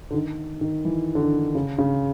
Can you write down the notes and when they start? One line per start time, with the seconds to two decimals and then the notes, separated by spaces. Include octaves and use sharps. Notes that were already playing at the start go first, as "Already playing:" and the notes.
0.11 D3
0.14 D#3
0.61 D#3
0.85 E3
1.15 D3
1.20 D#3
1.55 C#3
1.78 C#3